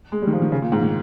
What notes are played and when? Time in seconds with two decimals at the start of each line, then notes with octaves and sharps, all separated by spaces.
0.12 G#3
0.22 G3
0.27 D#3
0.32 F3
0.42 D#3
0.52 C#3
0.62 A#2
0.72 G#2
0.81 D#3